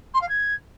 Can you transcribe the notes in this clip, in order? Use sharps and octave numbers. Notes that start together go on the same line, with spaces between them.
C6
F5
G#6